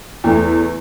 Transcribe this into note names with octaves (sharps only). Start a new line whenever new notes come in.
E2 A3